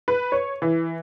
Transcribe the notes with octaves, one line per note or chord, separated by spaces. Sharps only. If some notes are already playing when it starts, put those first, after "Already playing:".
B4
C#5
E3